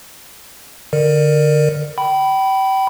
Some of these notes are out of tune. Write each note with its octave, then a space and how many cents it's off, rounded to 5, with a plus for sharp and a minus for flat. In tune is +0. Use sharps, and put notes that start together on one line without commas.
D3 +0 A#4 +0 D5 +25
G5 -30 B5 +0